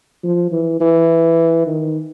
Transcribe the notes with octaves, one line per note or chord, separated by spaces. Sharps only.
F3
E3
E3
D#3